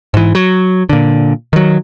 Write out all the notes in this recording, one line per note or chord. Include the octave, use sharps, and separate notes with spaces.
G#2 E3
F#3
A#2 D3
D#3 F#3